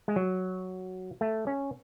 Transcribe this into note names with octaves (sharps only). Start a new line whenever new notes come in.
G#3
F#3
A3
C#4